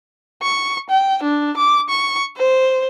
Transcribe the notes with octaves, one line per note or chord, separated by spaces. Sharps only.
C#6
G5
D4
D6
C#6
C5